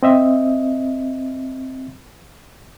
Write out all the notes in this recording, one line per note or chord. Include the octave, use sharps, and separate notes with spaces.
C4 D#5 E5